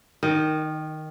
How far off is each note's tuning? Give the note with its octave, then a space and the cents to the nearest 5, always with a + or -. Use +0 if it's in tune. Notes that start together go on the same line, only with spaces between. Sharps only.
D#3 +0 D#5 -35